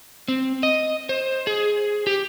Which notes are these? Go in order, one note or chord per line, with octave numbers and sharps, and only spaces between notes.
C4
D#5
C5
G#4
G4